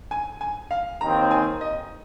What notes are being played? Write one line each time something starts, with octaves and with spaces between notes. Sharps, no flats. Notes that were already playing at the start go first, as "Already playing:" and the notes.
G#5
G#5
F5
D#2 D#3 C4 A#5
G#5
D#5